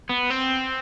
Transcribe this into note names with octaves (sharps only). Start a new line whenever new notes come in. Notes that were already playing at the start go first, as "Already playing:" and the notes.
B3
C4